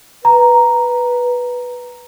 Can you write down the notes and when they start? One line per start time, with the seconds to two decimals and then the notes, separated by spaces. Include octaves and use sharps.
0.25 B4 A#5